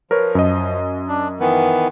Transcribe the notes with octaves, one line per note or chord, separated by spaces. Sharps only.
F3 A#4 B4 C#5
F#2 D#5
D4
D#3 E3 B3